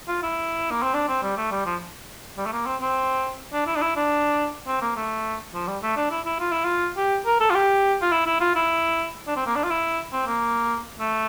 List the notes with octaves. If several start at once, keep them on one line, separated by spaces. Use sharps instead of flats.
F4
E4
A#3
C4
D4
C4
G3
A3
G3
F3
G3
A3
A#3
C4
C4
D4
E4
D4
E4
D4
C4
A#3
A3
F3
G3
A3
D4
E4
E4
F4
E4
F4
G4
A#4
A4
F4
G4
F4
E4
E4
F4
E4
D4
C4
A#3
D4
F4
E4
C4
A#3
A3